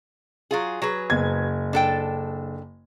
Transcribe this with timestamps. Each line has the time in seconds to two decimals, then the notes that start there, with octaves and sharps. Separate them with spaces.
0.51 F#3 F4 G#4
0.82 F#3 G#4 B4
1.10 F#1 G#6
1.73 D4 A4 G5